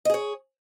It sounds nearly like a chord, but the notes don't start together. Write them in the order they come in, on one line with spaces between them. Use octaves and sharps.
D#5 G#4 C#5